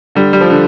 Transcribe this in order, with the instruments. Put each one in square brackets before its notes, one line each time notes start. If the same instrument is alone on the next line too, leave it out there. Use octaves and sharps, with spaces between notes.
[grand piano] D3 G3
G3
F3
D3